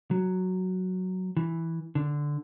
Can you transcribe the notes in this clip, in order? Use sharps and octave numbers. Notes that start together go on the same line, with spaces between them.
F#3
E3
D3